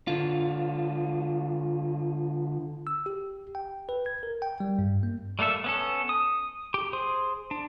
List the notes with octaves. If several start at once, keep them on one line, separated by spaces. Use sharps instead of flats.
D3 F4
E6
G4
G5
B4
G#6
A#4
G5
G3
G2
A#3
G3 A3 A#3 A4 E5
B3 C#4 A4
D#6
G4
G#4 C5
D4